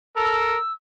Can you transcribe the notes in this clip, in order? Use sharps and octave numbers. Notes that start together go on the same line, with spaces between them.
A4 A#4 E6